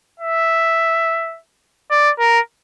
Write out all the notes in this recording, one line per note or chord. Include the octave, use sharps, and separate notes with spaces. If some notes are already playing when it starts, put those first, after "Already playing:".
E5
D5
A#4